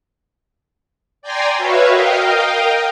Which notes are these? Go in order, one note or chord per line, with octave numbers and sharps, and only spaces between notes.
D5 G5 G#5 A#5 C6
F#4 B4 C#5 E5 F5
A#4 D#5 F5 G5